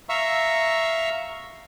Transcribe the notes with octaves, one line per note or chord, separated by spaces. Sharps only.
E5 F5 A#5 C#6 E6